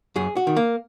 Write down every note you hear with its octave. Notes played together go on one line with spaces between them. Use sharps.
F#2 G#4
F#4
D#3
A#3